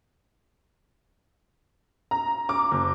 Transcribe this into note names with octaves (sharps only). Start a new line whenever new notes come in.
A#5
D6
F#1